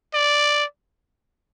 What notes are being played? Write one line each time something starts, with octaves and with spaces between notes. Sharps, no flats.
D5